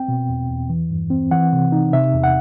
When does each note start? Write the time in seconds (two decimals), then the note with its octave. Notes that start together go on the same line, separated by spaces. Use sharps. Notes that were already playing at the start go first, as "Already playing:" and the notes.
Already playing: C4 G5
0.08 B2
0.29 E2
0.49 E2
0.70 E3
0.91 G2
1.10 C4
1.31 E3 F#5
1.53 C3
1.72 D#4
1.93 C3 E5
2.14 E2
2.24 F#5